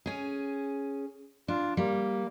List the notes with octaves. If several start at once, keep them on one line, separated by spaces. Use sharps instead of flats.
C#4 G#4
D4 F4
G3 A#3